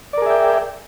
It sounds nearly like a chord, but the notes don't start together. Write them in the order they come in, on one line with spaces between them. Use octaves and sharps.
D5 A#4 G#4 E5 G5